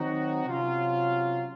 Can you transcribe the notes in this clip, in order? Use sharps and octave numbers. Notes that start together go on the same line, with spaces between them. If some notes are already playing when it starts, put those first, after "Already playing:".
Already playing: D#3 F#3 C4 D#4 F#4
C3 F#3 C#4 F4